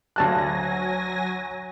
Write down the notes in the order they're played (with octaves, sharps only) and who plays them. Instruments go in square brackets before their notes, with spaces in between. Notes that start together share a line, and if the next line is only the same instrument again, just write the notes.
[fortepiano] D2 A5 F#6 [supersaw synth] F#3 G#5 A#6